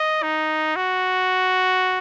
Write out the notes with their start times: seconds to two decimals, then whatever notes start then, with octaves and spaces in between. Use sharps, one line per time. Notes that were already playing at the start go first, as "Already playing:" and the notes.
Already playing: D#5
0.23 D#4
0.76 F#4